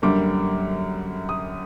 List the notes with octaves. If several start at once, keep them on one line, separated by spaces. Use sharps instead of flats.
F#2 D3 G3 A#3 D6
D#6